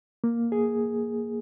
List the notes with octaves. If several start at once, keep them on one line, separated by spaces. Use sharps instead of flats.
A#3
G#4